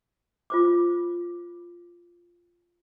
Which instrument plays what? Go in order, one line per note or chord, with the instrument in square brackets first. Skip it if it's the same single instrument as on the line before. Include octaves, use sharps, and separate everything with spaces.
[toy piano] F4 C5 D6